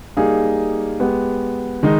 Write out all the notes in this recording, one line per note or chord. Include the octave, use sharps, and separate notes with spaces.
G3 A#3 D#4 G#4
G#3 B3 G4
D#3 G#3 D#4